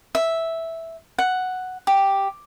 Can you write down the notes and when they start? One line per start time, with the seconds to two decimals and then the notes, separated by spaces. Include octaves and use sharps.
0.15 E5
1.18 F#5
1.87 G4